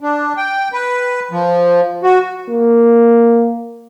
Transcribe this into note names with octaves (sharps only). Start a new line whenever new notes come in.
D4
G5
B4
F3
F#4
A#3